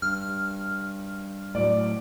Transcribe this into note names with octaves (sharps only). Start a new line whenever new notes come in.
G2 F6
A2 F#3 D5